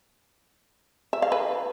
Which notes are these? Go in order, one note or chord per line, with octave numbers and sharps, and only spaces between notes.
E5
F5
B4